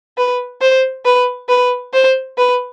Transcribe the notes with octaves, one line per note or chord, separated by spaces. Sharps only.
B4
C5
B4
B4
C5
B4